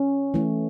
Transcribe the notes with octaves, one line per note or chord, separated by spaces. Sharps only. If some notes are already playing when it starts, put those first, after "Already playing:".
Already playing: C#4
E3 A3